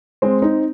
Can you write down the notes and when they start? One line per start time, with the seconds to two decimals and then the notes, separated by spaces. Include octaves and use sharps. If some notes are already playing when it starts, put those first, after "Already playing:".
0.22 G#3 C4
0.42 C4 D#4